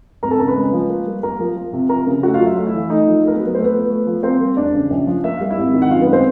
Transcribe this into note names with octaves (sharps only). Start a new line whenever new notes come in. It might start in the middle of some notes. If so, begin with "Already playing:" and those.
G#1 A#4 A#5
A4 A5
C#3 A#4 A#5
B4 B5
G#3
F3
A#3
G3
A#3 A#4 A#5
F3
F3
C3
F3 A#4 A#5
C#3
A3 F#4 F#5
F4 F5
F#3
E5
A3 F5
E4 E5
E3
A3 D#4 D#5
F3
A3 A#4
B3 B4
F#3
B4
A3 C5
B3 B4
F3
A3
F3
A#3 C4 C5
G3
E1 D4 D5
C#3
A#1
F3
A#3 E5
G3 F5
E4 E5
G#1
D#3
F#5
F#2 F4 F5
B3 B4
G#3
C4 C5